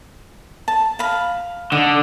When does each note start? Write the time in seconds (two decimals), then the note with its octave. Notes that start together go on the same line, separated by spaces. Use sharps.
0.68 A5
0.99 F5 B5
1.72 D3 D#5